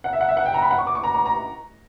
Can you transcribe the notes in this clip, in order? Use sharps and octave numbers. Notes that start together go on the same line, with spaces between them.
F#5
E5
F#5
E5
F#5
G5
A#5
B5
F#5
C#6
D6
C#6
A#5
A#5
A#5